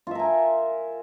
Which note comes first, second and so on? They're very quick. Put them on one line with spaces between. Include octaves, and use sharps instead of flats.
F4 E5 A#4 G#5